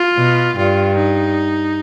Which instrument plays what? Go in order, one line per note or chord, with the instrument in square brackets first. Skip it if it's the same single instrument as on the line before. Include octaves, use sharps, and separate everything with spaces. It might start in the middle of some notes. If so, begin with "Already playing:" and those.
Already playing: [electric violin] F4
[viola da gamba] B2
[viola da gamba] G2 [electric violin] F4
[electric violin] D#4